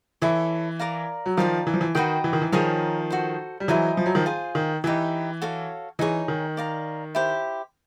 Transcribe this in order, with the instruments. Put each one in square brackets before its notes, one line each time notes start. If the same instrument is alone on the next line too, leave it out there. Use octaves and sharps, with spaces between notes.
[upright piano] E3 [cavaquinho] E4 A4 C#5
[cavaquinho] A#4 D5 F5 A#5
[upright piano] F#3
[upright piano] D#3 F3 [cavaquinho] F4 A#4 D5 F5
[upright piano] E3
F3
E3
[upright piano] D#3 [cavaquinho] F#4 B4 D#5 G5
[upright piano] E3
D#3
E3
[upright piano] D#3 F3 [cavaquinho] G#4 C#5 F5 A#5
[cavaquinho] F#4 A4 C5
[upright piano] G3
[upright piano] E3 F#3 [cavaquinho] E4 G#4 C5 D#5
[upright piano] F3
F#3
D#3 F3
[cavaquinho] F4 G#4 C5
[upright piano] D#3
[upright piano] E3 [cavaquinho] D#4 G4 B4 E5
[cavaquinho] F#4 A4 C#5 F5
[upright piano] E3 [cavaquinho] D#4 G#4 C#5
[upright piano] D#3
[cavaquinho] D5 F5 A#5
E4 G4 C5